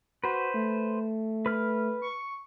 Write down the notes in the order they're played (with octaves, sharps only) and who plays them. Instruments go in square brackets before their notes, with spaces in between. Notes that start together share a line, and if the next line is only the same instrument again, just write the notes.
[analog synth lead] F#4 [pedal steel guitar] B4 C5
[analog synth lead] A3
[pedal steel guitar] B4 F6
[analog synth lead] C#6